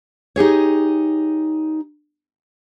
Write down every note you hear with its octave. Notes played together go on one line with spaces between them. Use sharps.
D#4 G4 G#4 C#5